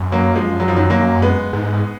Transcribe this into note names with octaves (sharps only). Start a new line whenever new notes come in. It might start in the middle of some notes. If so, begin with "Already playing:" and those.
Already playing: F#2
F#3 A#3
F3 G#3
F#3
F3
D#3 F#3
F#3 A#3
G#3 B3
G#2